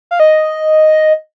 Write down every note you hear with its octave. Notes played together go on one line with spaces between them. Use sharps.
F5
D#5